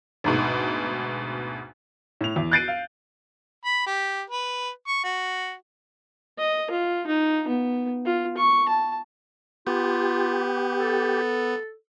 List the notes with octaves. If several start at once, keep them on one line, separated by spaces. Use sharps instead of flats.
D2 G#2 B2
A2 F7
E2
F#6 G6 A6 C7 D7 D#7
F5
B5
G4
B4
C#6
F#4
D#5
F4
D#4
B3
F4
C#6
A5
B3 F4 G4
A4